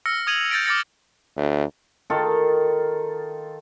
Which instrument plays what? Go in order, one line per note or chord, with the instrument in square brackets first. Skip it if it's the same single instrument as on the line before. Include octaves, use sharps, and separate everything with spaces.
[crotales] E6 F6 A#6 C#7
D#6 G#6 D#7 F7 F#7
G6 A6 A#6 D7
D6 F6 A6 A#6 C#7
[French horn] D2
[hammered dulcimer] D#3 F4 A4